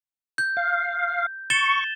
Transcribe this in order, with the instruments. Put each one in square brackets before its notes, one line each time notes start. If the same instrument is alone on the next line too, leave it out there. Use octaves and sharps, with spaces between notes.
[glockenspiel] G6
[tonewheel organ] F5
[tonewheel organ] C#6 [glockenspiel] A6 E7 G7